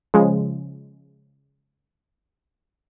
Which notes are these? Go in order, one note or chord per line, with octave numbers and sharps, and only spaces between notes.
C#3 F3 G#3